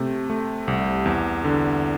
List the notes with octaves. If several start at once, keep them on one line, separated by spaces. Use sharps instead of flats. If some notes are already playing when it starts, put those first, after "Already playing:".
Already playing: C3 A3
A3
C2
E2
D3